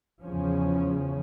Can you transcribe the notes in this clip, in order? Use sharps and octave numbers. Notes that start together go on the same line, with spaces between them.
E2 C#3 F3 C#4